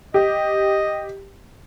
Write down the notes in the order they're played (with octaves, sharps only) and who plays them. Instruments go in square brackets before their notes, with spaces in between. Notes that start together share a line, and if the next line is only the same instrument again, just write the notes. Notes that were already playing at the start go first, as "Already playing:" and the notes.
[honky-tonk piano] G4 [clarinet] D#5